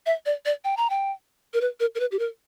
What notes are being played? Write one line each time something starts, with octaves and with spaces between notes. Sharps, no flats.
E5
D5
D5
G5
A#5
G5
A#4
B4
A#4
A#4
B4
G4
A#4